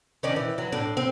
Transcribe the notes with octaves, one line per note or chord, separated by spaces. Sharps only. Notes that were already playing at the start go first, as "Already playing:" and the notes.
D#3 C#4 D4
E3
F#3
A2 D4
C4